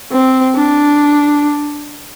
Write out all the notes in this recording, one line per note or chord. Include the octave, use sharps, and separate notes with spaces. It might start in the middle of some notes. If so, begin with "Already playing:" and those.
C4
D4